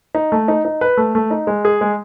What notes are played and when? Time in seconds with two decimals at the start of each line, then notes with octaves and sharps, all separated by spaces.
0.15 D#4
0.32 A3
0.48 D#4
0.65 D#4
0.81 B4
0.97 A3
1.15 A3
1.31 D#4
1.47 G#3
1.65 G#4
1.81 G#3